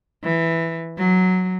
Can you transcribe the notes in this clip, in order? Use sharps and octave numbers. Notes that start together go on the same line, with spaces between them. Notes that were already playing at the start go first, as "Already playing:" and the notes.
E3
F#3